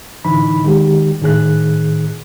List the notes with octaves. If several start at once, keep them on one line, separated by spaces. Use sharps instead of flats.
A2 D3 E3 D#4 B5
D#3 G#3 G4
A2 D#3 G#4 F#6